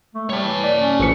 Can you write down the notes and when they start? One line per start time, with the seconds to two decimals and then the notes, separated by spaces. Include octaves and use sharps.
0.15 A3
0.30 G3 C#5 A5
0.45 E3
0.64 D5
0.76 C#4
0.99 A1 E3 C#7